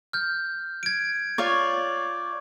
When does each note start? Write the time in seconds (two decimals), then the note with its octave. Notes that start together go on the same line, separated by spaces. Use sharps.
0.13 F6 G6
0.83 G#6 D7
1.38 F4 C#5 D5 C#6